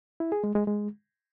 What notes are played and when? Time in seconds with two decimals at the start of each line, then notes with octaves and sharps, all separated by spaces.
0.20 E4
0.32 G#4
0.44 G#3
0.55 G#3
0.67 G#3